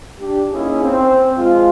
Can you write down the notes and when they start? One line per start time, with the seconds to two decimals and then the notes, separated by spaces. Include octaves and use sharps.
0.19 D4 G4
0.52 A#3 C#4 D#4 E4 G#4
0.84 C4
1.37 F3 G#3 F4